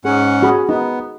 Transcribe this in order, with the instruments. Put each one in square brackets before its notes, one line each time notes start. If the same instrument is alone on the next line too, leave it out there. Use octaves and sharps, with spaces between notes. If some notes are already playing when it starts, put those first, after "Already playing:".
[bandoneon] G#2 C#4 F#5 [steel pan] G#4
[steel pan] F#4 G#4 B5
[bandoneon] B3 [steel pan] D#4